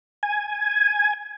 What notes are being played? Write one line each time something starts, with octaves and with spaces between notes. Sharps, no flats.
G#5